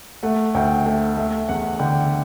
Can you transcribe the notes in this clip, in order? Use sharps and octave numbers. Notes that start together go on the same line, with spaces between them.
A3 F#5
D2 G5
A3 E5
A3 E5
E2 F#5
D3 G5